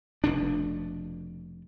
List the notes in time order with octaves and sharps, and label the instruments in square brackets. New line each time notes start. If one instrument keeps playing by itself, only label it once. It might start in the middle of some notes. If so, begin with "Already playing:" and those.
[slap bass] F1 B2 D4